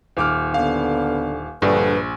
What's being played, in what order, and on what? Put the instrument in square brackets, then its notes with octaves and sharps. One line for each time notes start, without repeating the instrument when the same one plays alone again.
[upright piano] D#1 D6 F6
[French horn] D3 [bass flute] B3 [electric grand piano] F5
[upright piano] A#1 [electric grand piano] G2 [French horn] D3 [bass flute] B4